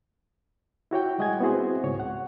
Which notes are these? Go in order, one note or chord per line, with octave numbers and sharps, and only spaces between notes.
E4 F#4 C#5 G5
G3 G#3 D#5 F#5 G#5 G#6
B3 C4 E4 F#4 G#4 C5
C#2 G#2 C#5
F#5